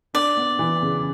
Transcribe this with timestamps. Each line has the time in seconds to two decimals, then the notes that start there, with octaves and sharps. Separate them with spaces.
0.14 D4 D5
0.37 B3
0.59 E3
0.82 C#3